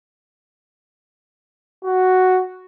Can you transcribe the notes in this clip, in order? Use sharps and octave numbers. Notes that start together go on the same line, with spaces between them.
F#4